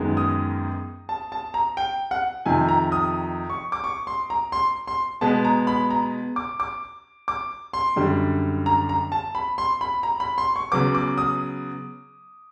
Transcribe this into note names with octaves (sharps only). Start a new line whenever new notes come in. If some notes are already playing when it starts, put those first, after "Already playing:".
Already playing: F#2 D#3 G#3 B3
D#6
A5
A5
A#5
G5
F#5
F2 C3 D#3 G#5
A#5
D#6
C#6
D6
C#6
C6
A#5
C6
C6
B2 G#3 B3 A5
A#5
B5
A#5
D6
D6
D6
C6
F#2 D3 G3
A#5
A#5
A5
B5
C6
B5
A#5
B5
C6
C#6
C#3 F#3 B3 D6
D6
D#6